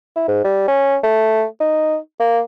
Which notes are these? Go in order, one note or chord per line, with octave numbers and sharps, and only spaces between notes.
E4
G#2
G3
C#4
A3
D#4
A#3